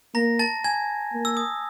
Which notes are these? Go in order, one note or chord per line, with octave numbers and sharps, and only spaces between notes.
A#3 A#5 A#6
A5 A6
G#5 G#6
A#3
E6
D#6